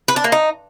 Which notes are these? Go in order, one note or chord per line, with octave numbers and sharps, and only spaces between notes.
B4
D4
A#3
D#4